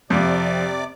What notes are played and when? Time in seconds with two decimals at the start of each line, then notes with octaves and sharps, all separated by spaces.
0.10 F2 C3 D5 D6